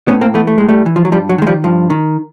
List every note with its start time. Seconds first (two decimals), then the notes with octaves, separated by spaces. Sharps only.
0.08 A2 B3 C#4
0.21 A#3 C4
0.34 E3 A3 B3
0.47 A3
0.58 A2 G#3
0.69 G3 A3
0.86 E3
0.96 F3
1.05 F#3
1.12 G2 F3 G3
1.29 F#3
1.38 D#3 G#3
1.47 F3 G3
1.64 G2 F3
1.90 D#3